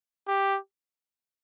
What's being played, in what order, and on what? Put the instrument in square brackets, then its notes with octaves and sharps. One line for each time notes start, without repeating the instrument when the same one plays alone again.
[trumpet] G4